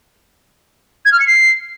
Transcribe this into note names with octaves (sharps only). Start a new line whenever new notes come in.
G#6
F6
C#7
C7